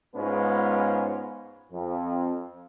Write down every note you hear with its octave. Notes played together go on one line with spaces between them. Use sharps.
G#2 G#3 B3 C#4 F4 B4
F2